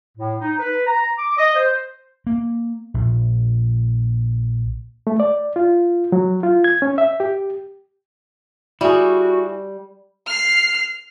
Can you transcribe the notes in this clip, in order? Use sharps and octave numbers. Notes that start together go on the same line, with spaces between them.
A2
D#4
B4
A#5
D6
D#5
C5
A#3
A#1
A3
D5
F4
F#3
F4
G#6
C#4
E5
G4
G3 E4 F#4 G#4
F6 C7